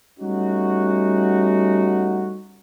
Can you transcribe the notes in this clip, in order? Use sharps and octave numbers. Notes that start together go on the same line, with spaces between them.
G3 A3 C#4 D#4 F#4